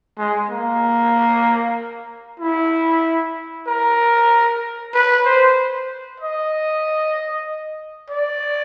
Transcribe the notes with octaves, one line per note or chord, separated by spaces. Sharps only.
G#3
A#3
E4
A#4
B4
C5
D#5
D5